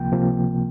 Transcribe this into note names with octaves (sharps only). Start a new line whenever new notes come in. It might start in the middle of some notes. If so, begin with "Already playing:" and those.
Already playing: C#2 C3 F3 A#3 G5
C3 F3 A#3